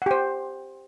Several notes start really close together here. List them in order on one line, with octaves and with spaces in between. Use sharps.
F#5 G4 C5